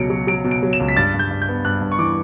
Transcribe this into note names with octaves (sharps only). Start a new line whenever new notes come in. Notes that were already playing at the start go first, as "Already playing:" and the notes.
Already playing: C#2 B2 F#3 C#7 D7
F#3
F#3 D7
B2
D7
F#3
E7
C#2
B6
G2 A6
G2
G6
G2
G6
B3
G2 F#6
G2
C#6
E3 D6